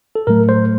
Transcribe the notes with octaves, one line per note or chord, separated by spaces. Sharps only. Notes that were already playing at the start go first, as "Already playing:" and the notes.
A4
A2 F#3 A3 A#4
C5